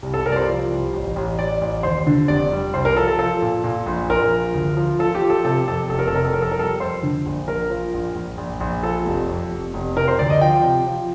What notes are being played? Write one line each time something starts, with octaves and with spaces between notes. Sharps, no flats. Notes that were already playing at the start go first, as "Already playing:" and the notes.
C2
A4
C2 A#4
D5
C5
F3
C2
A1
A1
A1 D5
A1
D#2 C5
D3
F1 D5
G3
C2 C5
A#4
F3 A4
A4
F3 A4
A#2
A#2
A#1
A#1 A#4
F3
D2
F3
F3 A4
G4
F3
A4
C3 A4
F2 A4
F1 A4
A#4
A4
C3 A#4
A4
F2 A#4
A4
A#4
G3 A4
F2 C5
D3
A#1
A#1 A#4
F3
A#1
A#1
A#1
A#1
F3 A4
F1
F2
F1
F1
C3 A#4
C5
D2 D5
D#5
F3 G5
C3
F3